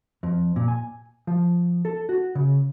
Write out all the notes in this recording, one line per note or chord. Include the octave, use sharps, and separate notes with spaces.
F2
A#2
G#5
F3
A4
F#4
C#3